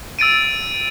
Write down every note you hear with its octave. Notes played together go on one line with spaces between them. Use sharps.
E6 A6 D7 D#7